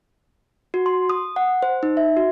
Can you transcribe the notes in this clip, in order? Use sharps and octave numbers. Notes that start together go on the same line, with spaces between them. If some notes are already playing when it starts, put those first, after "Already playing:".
F#4
C6
D#6
F#5
C5
D#4
E5
F#4